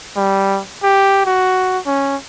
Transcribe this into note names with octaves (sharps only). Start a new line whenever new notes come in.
G3
G4
F#4
C#4